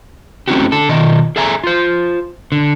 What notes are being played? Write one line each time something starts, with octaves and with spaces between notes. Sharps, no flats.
A3 C4 C#4 E4 F#4 G4
D3 A4
B2 D#3 F4 D#5
G#4 A4 E5 G#5 A#5
F4 C5
D3